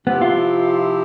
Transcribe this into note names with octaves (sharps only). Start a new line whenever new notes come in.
C3 F3 B3 C4 E4 G4
F4